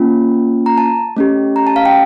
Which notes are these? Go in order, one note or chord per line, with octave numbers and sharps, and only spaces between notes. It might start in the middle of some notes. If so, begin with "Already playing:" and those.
Already playing: A#3 C#4 F4
A#5
A5
A3 C#4 G4
A#5
A5
F5
G5